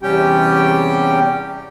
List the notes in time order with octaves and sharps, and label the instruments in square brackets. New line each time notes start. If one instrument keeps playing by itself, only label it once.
[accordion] E2 C3 G3 C#4 G4 G5